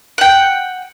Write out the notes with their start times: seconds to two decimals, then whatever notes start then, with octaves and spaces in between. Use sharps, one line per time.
0.18 F#5 G5